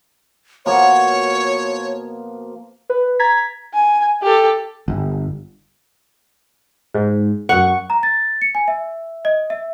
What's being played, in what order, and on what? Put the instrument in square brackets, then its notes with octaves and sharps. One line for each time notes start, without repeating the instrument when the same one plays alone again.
[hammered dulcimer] B2 F3 A#3 [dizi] C#5
[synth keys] B4
A#5 G#6 A6 B6
[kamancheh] G#5
G4 A4
[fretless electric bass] G1
[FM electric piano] G#2
[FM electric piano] F#2 C#6 [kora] F#5
[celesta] A#5
A6
C#7
G#5
E5
D#5
E5